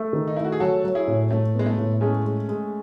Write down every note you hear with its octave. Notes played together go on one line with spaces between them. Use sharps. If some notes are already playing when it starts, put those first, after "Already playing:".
Already playing: A3
D#3
D#4
A3 E4
F#4
G#4
F#3 F#4 A4
F#3
E4 G#4
A2
A2 A3
B3
G#3
A3
A2
G#3 A3 C#4
G#3
G#3